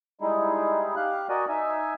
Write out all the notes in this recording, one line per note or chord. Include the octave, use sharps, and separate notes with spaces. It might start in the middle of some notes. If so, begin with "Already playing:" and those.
G3 G#3 D#4 E4 G#4
G4 F5 F#6
F#4 A#4 D5 D#5 G#5
D#4 E5 G#5